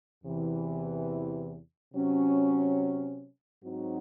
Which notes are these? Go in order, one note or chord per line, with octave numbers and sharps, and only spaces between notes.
E2 C3 E3
C3 F#3 C#4
G#2 F#3 C4 D#4 F#4